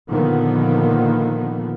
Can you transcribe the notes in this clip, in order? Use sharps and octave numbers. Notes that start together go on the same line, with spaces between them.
A#2 D3 D#3 F3 A#3 B3